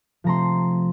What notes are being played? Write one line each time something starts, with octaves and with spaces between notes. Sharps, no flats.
C3 F3 A3 C4 A#5 C6